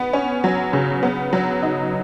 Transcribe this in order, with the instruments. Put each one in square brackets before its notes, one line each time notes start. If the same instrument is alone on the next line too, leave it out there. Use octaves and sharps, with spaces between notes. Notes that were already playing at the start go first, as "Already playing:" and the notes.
Already playing: [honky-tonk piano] B3
C#4
F#3
C#3
B3
F#3
D#4